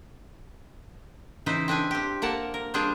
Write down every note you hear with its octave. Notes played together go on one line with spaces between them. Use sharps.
C#3 E3 D#4 E4 B4 C5
C4 D4 B4 G#5
C4 G4
A#3 A#4 F#5 A5
A#4
G3 C4 D4 F4 G#4 C5